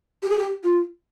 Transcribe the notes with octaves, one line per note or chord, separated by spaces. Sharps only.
G4
G#4
G4
F4